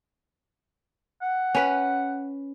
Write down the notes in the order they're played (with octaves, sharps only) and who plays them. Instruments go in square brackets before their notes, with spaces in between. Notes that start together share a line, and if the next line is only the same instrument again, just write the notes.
[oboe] F#5
[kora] C#4 B4